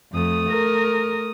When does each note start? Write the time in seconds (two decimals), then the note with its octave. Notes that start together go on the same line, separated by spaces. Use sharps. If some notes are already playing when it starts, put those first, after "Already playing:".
0.13 F2 A3 D#6
0.50 A#4